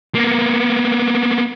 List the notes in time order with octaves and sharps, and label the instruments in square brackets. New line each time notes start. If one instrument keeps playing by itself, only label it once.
[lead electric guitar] A#3 B3